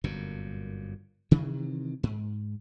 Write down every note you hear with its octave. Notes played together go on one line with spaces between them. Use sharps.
G1 F#2 A#2
C3 D#3 E3
G#2